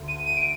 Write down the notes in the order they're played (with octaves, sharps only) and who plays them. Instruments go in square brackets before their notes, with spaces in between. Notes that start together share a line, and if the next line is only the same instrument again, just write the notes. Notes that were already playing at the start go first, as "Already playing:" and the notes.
Already playing: [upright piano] D2 D3
[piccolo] D#7
D#7
D7